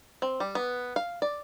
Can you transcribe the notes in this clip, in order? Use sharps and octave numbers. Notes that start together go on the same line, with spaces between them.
C4
G3
B3
F5
D5